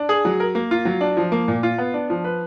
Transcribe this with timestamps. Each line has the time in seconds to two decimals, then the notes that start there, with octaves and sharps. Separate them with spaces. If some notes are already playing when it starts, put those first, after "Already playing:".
Already playing: D4
0.09 G#4
0.25 F#3
0.40 A#4
0.55 A#3
0.71 F4
0.85 F#3
1.01 D4
1.17 F3
1.32 A#3
1.48 A#2
1.63 F4
1.78 B3
1.94 D4
2.10 F3
2.24 B4